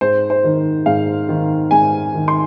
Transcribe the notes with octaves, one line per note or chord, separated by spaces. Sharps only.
G#2 C5
C5
D#3
G#2 F5
D#3
G#2 G#5
D#3
C6